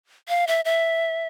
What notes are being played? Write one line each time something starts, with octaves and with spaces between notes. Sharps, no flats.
F5
E5
E5